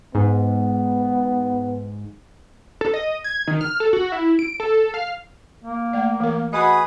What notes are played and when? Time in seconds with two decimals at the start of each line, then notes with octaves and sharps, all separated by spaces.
0.15 G#2 B3
2.81 A4
2.94 D#5
3.24 G#6
3.48 D#3
3.61 F6
3.80 A4
3.93 F#4
4.12 E4
4.39 D7
4.60 A4
4.94 F5
5.64 A#3
5.93 A3 D5
6.20 E3 A#4
6.53 F#4 G#4 B4 D#5 B5 D#6